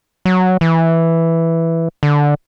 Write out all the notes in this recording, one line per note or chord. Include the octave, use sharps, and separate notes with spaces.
F#3
E3
D3